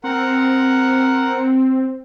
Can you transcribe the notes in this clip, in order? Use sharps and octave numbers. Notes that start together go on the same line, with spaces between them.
C4 A#4 F#5